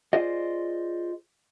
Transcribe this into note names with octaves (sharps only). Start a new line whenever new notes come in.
F4 G#4 C5 D5 D#5